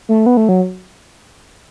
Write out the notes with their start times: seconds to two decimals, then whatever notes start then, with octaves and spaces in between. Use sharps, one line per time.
0.09 A3
0.26 B3
0.37 A3
0.49 F#3